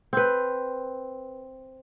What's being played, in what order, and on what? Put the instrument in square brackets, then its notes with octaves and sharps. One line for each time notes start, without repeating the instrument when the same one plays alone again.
[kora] C4 B4